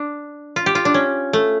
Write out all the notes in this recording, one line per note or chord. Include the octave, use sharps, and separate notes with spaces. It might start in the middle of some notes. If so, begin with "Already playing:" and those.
Already playing: D4
F4
G4
F4
D4
C#4
A3